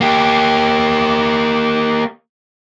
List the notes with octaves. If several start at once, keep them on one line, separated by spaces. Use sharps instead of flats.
A#3 G4